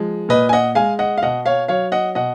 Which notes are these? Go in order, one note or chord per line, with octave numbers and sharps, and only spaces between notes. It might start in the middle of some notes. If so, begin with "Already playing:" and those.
Already playing: F3 G#3
A#2 B4 D#5
G#5
D#5 F#5
G#3 F5 G#5
D#5 F#5
F5
B2 D#5 F#5
C#5 F5
F#3 C#5 F5
D#5 F#5
B2 D#5 F#5